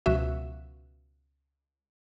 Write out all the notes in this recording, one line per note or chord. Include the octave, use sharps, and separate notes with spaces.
C#2 B2 F3 F#4 E5